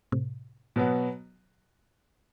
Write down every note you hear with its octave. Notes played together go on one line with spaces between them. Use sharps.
A2 C3
B2 F#3 B3 F#4